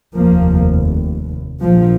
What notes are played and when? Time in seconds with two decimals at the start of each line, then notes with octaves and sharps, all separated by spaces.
0.15 F1 D#2 F3 A#3
1.62 A#1 A#2 F3